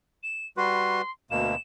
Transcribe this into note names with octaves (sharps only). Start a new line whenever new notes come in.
E7
G3 F#4 B4 C6
D2 B2 A#3 E7